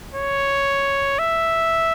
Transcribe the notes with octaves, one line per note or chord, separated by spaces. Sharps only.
C#5
E5